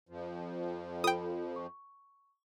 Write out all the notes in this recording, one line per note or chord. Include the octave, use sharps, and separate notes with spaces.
F2 F3
F4 A4 G5 B5 D#6
C#6